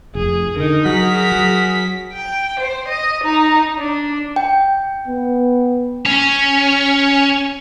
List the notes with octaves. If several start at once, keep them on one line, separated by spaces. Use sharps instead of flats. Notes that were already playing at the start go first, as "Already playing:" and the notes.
F1 G#4
D3 D#4 A#4
F#3 F#4 G#4 A#4 B6
F#3
G5
C5
D#5
D#4
D4
G5
B3
C#4